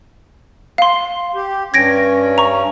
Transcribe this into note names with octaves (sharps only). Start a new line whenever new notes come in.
F5 C6
G4
G2 C#4 G#6 A#6 D7
A#5 C#6